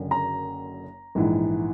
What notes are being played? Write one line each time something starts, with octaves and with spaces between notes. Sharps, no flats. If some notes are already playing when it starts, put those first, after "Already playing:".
Already playing: F#1 F#2 D3
A#5
A#1 G#2 E3